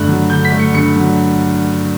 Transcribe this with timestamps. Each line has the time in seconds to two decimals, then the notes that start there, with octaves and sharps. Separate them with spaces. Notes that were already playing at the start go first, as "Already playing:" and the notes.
Already playing: G2 D3 A3 F#6
0.08 F#3
0.30 D3 G6
0.45 B6
0.52 A3
0.60 C#7
0.74 G2 C#7
0.96 F#3